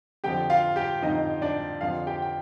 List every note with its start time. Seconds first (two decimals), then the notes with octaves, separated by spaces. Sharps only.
0.24 F2 D3 F3 G4 G5
0.50 F4 F5
0.76 G4 G5
1.02 F2 D3 F3 D#4 D#5
1.42 D4 D5
1.81 F2 D3 F3 F4 F5
2.07 G4 G5
2.22 G5